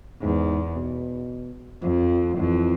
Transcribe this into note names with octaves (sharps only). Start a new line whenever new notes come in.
E2 G#2
B2
F2 F3
F2 E3